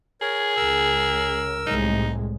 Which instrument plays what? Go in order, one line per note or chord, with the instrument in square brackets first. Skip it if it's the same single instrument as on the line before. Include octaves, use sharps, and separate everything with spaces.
[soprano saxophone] G#4 [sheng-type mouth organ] A#4 C#5
[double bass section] C#2 C#3 [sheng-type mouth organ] A#4 E6
[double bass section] C2 A2 G#3 [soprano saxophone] D#4